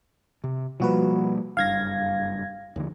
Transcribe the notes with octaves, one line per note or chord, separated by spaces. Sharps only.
C3
B2 F3 G3 A#3 F#4 B4
F#1 G2 F5 G#6 A#6
D#2 D3 F3